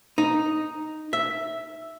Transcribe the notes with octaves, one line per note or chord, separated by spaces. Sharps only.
D#4
E5